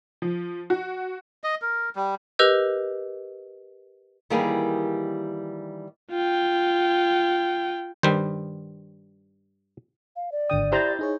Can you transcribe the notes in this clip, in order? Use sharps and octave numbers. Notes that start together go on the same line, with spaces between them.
F3
F#4
D#5
A#4
G3
G4 A#4 B4 D#5 E6 G6
D#3 E3 G3 A#3 G4 G#4
F4 G5
G2 D#3 G3 C5
F5
D5
G#1 D3 G5 D#6
E4 G4 C5 A#5 A6
D#4 G#4 C#5